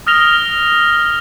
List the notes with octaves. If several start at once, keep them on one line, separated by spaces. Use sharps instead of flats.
D#6 F6 A#6 F7 G7